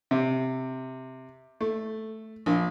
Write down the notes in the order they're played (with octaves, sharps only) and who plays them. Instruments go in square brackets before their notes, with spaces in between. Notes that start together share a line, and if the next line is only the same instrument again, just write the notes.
[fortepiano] C3
A3
A#1